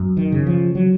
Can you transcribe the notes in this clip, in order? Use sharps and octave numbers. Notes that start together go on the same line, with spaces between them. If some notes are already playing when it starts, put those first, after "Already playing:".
Already playing: F#2
D#3
C#3
F3
F#3